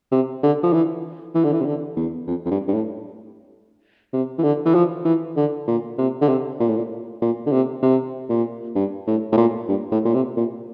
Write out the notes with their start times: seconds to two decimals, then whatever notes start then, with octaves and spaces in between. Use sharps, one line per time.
0.12 C3
0.43 D3
0.63 F3
0.73 E3
1.35 E3
1.44 D3
1.53 E3
1.61 C3
1.65 D3
1.97 E2
2.28 F2
2.46 F2
2.51 G2
2.68 G2
2.74 A2
4.13 C3
4.38 E3
4.43 D3
4.66 E3
4.75 F3
5.05 E3
5.36 D3
5.67 A#2
5.98 C3
6.21 D3
6.29 C3
6.60 A#2
6.69 A2
6.77 A#2
7.22 A#2
7.47 D3
7.52 C3
7.82 C3
8.29 A#2
8.75 G2
9.07 A2
9.32 A2
9.37 A#2
9.68 G2
9.92 A2
10.05 A#2
10.14 C3
10.37 A#2